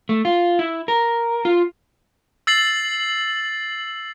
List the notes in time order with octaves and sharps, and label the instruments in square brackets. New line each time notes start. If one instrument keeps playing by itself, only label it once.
[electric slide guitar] A3
F4
E4
A#4
F4
[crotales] E6 A6 C7 F#7